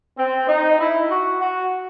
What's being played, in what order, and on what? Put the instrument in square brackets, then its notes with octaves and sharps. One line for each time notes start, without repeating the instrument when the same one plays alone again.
[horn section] C4
D#4
E4
F#4
F#4